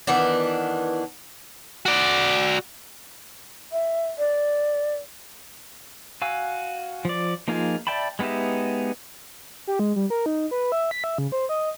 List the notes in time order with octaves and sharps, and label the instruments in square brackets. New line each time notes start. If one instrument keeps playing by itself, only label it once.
[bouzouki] D#3 E3 B3 D4
[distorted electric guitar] F#4 D5
[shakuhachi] E5
D5
[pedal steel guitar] F#4 F5 G#5 E6
F3 D5
F3 A#3 D#4 F4 G#4
D5 E5 G5 A5 B5
G#3 B3 D#4 G4 E5
[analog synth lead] G4
G#3
G3
A#4
D#4
B4
E5
B6
E5
C#3
C5
D#5